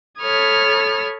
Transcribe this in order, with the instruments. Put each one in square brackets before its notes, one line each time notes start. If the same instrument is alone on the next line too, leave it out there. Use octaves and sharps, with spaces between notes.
[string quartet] A4 C#5 B5 D#6 F6 G#6